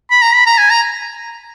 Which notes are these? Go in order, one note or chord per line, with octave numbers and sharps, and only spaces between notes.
B5
A#5
B5
A#5
G#5
A#5